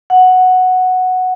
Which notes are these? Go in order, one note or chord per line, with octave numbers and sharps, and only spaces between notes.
F#5